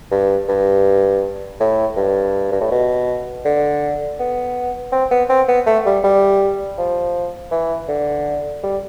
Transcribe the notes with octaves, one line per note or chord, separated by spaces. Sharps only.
G2
G2
A2
G2
G2
A2
B2
D3
B3
C4
B3
C4
B3
A3
G3
G3
F3
E3
D3
G3